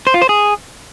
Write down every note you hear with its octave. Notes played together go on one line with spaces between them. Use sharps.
C5
F4
C5
G#4